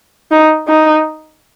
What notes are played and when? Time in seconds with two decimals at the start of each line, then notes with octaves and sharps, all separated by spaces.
0.31 D#4
0.68 D#4